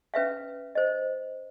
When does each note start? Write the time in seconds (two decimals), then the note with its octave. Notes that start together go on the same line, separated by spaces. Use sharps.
0.14 C#4 B4 E5 F5
0.75 C5 D#5